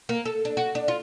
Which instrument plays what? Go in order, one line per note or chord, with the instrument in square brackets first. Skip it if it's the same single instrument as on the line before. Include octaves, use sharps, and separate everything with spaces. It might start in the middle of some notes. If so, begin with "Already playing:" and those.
[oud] A#3
A4
D4
F#4
D4
F4